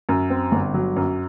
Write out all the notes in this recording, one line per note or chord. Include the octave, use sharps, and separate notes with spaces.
F#2
C4
G1
F#3
F#2